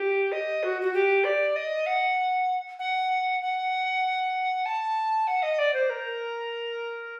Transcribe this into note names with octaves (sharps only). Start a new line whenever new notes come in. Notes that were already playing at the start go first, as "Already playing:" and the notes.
Already playing: G4
D#5
F#4
F#4
G4
D5
D#5
F#5
F#5
F#5
A5
F#5
D#5
D5
C5
A#4